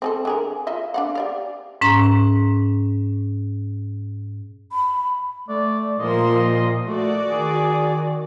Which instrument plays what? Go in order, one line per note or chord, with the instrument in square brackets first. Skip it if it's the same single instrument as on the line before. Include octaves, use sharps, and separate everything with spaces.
[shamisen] C4 G#4 A4
D3 G#4 A#4
F4 D#5 E5
D4 F5 F#5
G4 D5 F5
[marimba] G#2 C#4 A#5
[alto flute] B5
[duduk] A3 [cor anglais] D5
[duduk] A#2 [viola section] F3 A#3 C6 [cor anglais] D#5
[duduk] A3 [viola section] F#4 D5
[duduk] D#3 [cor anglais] G#4